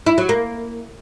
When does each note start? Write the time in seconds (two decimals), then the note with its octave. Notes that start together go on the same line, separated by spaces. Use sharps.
0.06 E4
0.18 F#3
0.29 A#3